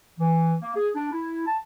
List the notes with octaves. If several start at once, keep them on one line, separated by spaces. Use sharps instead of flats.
E3
A#3
G#4
D4
E4
A5